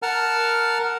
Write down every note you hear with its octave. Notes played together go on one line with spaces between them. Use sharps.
A#4 F#5 A5 F6